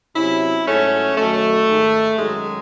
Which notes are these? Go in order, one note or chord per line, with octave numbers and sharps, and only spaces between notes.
C3 F#3 C#4 E4
G#2 F#3 A3 C#4
F#2 D#3 F#3 A3
G#2 D#3 G#3
F#2 D#3 F#3 G#3